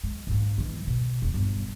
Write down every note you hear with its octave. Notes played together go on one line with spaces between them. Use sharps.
G#3
G#2 A#3
E3 G#3
B2
E1
G1